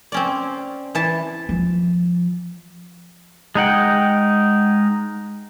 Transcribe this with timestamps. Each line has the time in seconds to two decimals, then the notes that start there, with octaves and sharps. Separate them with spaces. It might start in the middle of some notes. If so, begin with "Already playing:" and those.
0.12 C4 C#4 D5
0.95 E3 A5
1.49 F3
3.55 G#3 D#4 F#5 G5